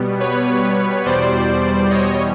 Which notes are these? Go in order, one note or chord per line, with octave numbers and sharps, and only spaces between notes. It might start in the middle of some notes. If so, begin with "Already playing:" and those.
Already playing: B2 G3 B3
B4 C#5
E2 B2 G3 C5 D5
C#5 D#5